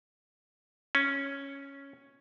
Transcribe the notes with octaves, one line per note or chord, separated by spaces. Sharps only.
C#4